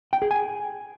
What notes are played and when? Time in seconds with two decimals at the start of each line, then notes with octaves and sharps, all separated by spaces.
0.13 G5
0.22 G#4
0.31 G#5